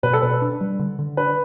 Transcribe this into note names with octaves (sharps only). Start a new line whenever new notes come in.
B2 B4
A4
B2 B4
D4
G3
D3
D3
D4 B4